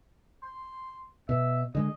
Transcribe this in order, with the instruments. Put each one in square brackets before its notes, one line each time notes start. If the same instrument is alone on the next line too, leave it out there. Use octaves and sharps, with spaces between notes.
[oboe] C6
[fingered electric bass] B2 [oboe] E5
[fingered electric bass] D3 G#3 [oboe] D#5